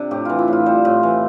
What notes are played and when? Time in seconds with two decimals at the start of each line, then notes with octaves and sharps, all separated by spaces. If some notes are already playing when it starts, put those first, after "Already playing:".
Already playing: C3 D4
0.11 A2 G4
0.25 E3 F4
0.39 E4
0.48 A2 F4
0.66 G3 C5
0.85 A2
1.03 E3